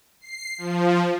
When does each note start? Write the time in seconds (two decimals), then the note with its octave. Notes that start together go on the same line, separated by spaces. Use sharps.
0.21 C7
0.58 F3